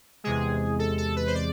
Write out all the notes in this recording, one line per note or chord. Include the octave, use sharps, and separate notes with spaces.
E2 C3 G#3 G#4
A4
A4
B4
C5
D5